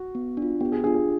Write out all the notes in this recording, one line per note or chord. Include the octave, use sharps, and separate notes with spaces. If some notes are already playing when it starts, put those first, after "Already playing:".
Already playing: F#4
B3
D4
F4
B3 G4
G#4
D4 F4 G#4
G#4